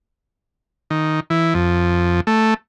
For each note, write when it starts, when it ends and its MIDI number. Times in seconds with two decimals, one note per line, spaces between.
0.90 1.20 51
1.30 1.54 52
1.55 2.20 41
2.27 2.54 57